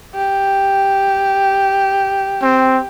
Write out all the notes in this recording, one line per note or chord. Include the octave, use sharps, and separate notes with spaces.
G4
C4